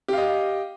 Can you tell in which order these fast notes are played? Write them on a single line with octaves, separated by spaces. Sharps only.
G4 F5 D#5